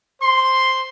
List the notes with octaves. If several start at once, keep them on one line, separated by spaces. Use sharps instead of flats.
C5 C6